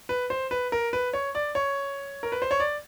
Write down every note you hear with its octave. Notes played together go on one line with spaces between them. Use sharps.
B4
C5
B4
A#4
B4
C#5
D5
C#5
A#4
B4
C5
C#5
D5